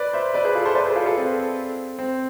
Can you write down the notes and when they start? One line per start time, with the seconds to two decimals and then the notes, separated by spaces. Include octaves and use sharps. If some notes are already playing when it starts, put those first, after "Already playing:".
Already playing: B4 D5
0.13 C5 E5
0.34 B4 D5
0.45 G#4 B4
0.55 F4 A4
0.65 A4 C5
0.75 B4 D5
0.86 G#4 B4
0.96 F4 A4
1.06 F4 A4
1.17 C4
1.99 C4